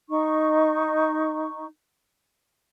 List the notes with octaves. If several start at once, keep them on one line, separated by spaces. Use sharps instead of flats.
D#4 C#6